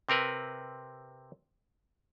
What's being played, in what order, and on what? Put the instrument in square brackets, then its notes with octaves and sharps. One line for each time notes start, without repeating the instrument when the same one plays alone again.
[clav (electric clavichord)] C3 C4 A#4 B4